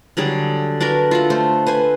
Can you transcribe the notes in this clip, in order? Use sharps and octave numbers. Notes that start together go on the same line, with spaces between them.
D3 F#3 G3 G#4
D4 F#4 A#4 B4
F4 E5 F#5
A3 C5
B4 C5 G#5